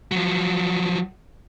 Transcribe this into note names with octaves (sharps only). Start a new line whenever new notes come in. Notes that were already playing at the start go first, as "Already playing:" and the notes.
F3 F#3